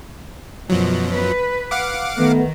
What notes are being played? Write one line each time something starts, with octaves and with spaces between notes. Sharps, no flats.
F#2 B2 F3 F#3
B4
F5 F#5 D6
D#3 A3 B3